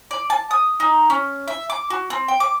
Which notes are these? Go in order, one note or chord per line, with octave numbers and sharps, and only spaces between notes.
D5
A5
D#6
D#4
C#4
E5
D6
F#4
C4
G5
D6